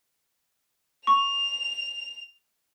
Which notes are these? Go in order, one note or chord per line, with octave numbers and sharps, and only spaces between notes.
C#6 F7